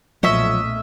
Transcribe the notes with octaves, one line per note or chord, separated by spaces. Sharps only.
B1 A#2 F3 F#3 A3 C#4 D#5 E5